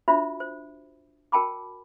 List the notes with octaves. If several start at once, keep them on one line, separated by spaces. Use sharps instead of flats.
D4 F4 F#4 C5 E5 B5
C5
F#4 A#4 G5 A5 B5 D6